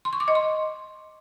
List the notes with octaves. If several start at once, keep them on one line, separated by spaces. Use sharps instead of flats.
C6
C#6
D6
D#5
C6